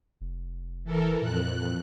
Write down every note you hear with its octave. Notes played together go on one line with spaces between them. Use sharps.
F1
E3 A4 A#4
F2 A#2 F#6